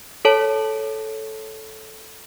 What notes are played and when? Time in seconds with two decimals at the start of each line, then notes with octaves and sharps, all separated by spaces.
0.25 A4 C#5 A5